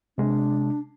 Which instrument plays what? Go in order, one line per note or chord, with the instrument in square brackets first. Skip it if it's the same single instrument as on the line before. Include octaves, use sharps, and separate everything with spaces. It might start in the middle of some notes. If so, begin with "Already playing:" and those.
[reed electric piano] C3 G#3 [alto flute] D4